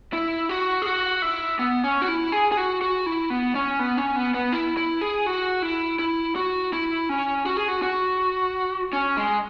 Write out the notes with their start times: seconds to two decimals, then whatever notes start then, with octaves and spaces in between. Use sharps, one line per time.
0.13 E4
0.49 F#4
0.82 G#4
0.86 F#4
1.22 E4
1.59 B3
1.83 C#4
2.02 F#4
2.08 E4
2.32 G#4
2.52 G#4
2.57 F#4
2.82 F#4
3.06 E4
3.30 B3
3.55 C#4
3.79 B3
3.97 C#4
4.16 B3
4.34 B3
4.52 E4
4.77 E4
5.01 G#4
5.26 F#4
5.62 E4
5.99 E4
6.36 F#4
6.73 E4
7.09 C#4
7.46 F#4
7.57 G#4
7.68 F#4
7.82 F#4
8.93 C#4
9.17 G#3